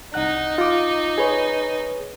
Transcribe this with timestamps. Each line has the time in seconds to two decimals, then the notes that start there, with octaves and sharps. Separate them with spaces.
0.14 C2 D#4 F#5 F#6
0.58 F4 D6
1.18 G#4 B4 C#5